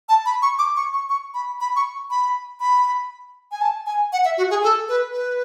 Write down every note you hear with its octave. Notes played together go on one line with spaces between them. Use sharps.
A5
B5
C#6
D6
C#6
C#6
C#6
B5
B5
C#6
B5
B5
G#5
A5
G#5
F#5
E5
F#4
G#4
A4
B4
B4